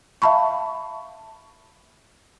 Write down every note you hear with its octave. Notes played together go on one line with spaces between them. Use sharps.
E5 F5 A5 B5 C#6